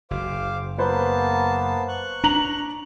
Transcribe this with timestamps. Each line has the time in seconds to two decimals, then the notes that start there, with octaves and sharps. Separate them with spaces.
0.11 F#1 C5 F5 D6
0.78 A#3 B3 B4 C5 A5
1.88 C#6 F#6
2.24 D4 A#5 F7 F#7